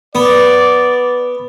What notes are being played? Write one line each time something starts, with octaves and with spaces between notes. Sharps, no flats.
B3 D5